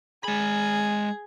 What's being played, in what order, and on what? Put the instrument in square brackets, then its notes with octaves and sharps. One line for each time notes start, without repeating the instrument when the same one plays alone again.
[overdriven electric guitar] G#3 B5 [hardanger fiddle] G#4